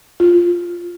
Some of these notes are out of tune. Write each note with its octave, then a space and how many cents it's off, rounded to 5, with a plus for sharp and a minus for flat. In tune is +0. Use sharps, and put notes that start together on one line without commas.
F4 -5